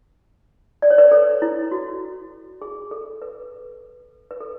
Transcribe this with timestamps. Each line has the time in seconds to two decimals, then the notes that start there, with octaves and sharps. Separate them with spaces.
0.82 D5
0.90 C#5
0.98 B4 D5
1.12 A4 C#5
1.42 E4
1.71 F#4
2.62 G#4
2.91 A4
3.22 B4
4.31 B4
4.40 A4